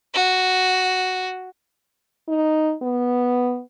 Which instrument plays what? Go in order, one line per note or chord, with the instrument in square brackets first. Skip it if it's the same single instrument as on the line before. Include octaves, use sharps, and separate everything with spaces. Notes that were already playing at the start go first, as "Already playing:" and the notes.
[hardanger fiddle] F#4
[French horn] D#4
B3